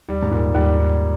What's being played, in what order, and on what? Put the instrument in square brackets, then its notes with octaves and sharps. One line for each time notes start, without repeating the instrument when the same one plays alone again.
[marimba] D#2 [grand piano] G3
[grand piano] G#2
[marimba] D#2 [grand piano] A#2
[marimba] D#2 [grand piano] G3
[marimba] D#2